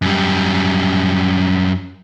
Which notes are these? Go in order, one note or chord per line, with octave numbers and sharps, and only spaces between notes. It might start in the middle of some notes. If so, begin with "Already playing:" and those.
F#2 G3